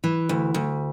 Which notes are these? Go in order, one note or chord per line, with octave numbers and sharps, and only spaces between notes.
E3
D2
D2